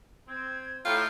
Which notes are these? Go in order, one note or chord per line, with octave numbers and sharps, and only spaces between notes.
C4 G#6
A2 F4 G5 A#5 G6